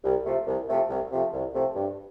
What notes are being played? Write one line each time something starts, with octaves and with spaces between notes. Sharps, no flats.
C2
C3 F3 A3
C2
C3 F3 A3
C2
C3 F3 A3
C2
C3 F3 A3
G2